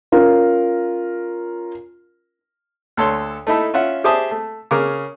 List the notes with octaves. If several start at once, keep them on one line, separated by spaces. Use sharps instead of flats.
C#4 F4 A#4
D2 A4 C#5 C6
A3 D#4 E4 A4
C#4 F4 E5 F#5
G4 G#4 C5 E5 A5 D#6
A3
C#3 G#4 A#4 A#5 D6